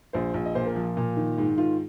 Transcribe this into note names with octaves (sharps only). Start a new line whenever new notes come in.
A#1 C5
A#1
D#5
A#2 C5
A#4
F3
A#2
D#3
G#2
D#3 F4